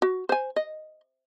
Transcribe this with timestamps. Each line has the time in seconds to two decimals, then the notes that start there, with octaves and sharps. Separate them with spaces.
0.02 F#4
0.29 C5 G#5
0.56 D#5